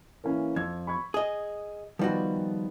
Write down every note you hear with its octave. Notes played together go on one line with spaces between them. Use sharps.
E3 A#3 C#4
F2 G#6
B5 C#6 G#6
G#4 D#5 D#6
D#3 F3 G3 B3 F#4